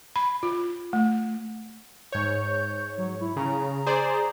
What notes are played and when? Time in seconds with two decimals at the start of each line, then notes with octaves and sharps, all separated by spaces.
0.16 B5
0.43 F4
0.93 A3
2.12 G#2 C#5 G6
2.98 F#3
3.21 E4
3.36 C#3 A#5
3.86 G#4 C5 D5